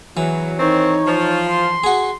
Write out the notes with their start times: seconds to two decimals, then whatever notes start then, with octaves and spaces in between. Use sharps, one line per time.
0.17 E2 E3 F#3
0.59 D#3 C4 D#4 C#5
1.07 F3
1.48 C6
1.84 F#4 G#4